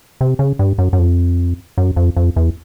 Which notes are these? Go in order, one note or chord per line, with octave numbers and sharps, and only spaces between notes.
C3
C#3
G2
F#2
F#2
F2
F#2
F2
F2
E2